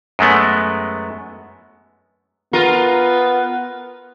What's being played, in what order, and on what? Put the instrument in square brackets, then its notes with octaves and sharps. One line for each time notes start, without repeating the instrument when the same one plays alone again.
[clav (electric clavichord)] F#2 G#3 A3 B3
[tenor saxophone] B3 [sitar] F4 A#4